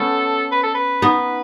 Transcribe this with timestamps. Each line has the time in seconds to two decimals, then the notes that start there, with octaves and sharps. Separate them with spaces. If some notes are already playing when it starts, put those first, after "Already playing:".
Already playing: A3 B3 C#4 A4
0.52 B4
0.63 A4
0.75 B4
1.02 B3 D#4